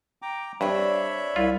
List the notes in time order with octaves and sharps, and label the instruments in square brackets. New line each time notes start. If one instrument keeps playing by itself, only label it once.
[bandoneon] G5 A#5 D6
[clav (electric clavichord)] G2 [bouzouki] C4 D4 [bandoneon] C#5 E5 B5
[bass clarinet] C2 [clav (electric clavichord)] F4